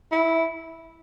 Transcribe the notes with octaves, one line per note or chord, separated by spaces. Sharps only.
E4